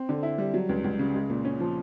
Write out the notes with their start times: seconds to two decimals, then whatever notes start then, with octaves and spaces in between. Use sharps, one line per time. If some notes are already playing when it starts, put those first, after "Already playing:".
Already playing: C4
0.09 D3
0.23 E4
0.38 G3
0.54 F#3
0.69 C#2
0.84 C#2
0.99 C#3
1.14 G#3
1.29 A#2
1.44 C#4
1.60 F3